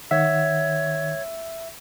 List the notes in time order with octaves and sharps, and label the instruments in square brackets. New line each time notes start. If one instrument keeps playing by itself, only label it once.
[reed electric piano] D#3 F#5 [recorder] C#5 [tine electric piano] E5